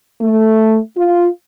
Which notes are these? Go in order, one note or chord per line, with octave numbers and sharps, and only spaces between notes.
A3
F4